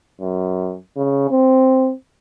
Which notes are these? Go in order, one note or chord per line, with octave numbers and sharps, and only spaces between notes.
F#2
C#3
C4